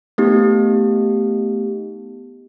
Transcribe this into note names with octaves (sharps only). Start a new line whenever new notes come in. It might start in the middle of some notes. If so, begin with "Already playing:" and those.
A3 B3 D#4 G4